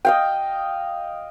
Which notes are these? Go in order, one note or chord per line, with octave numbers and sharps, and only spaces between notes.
D#5 F5 G5